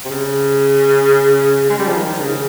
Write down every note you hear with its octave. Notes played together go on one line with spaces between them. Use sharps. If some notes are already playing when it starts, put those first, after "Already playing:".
C3
C#3
G#3
G3
F3
D#3
C#3